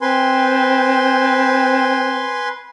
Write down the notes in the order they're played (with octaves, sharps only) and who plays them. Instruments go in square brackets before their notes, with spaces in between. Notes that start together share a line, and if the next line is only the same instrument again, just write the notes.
[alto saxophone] C4 [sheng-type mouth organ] B4 G#5 C6